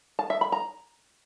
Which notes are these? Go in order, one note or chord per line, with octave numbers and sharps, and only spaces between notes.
A5
E5
B5
A#5